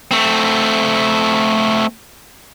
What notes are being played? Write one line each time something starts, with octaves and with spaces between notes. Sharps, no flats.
A3 C4